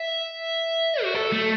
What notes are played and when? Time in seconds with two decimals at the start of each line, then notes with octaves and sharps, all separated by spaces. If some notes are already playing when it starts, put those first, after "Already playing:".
Already playing: E5
1.03 F#4
1.15 A4
1.32 A3